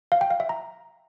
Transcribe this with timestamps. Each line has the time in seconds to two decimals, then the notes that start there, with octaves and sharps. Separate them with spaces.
0.12 F5
0.21 G5
0.30 F5
0.40 E5
0.49 A#5